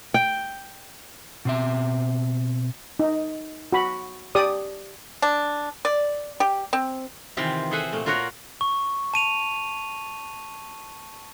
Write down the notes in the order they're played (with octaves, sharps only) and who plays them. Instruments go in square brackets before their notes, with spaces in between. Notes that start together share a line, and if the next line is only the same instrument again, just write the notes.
[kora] G5
[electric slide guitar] B2 C4 E5
[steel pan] D#4
F#4 B5
G4 D5 D#6
[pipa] D4
D5
G4
C4
[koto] C3 D#3 E3 C4 F4 G4
G#4 A4 C5 E5 F#5 G#5
A#2 A3 A#3
F4 F#4 A#4 C#5 F#5
[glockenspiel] C#6
A5 D#7 F7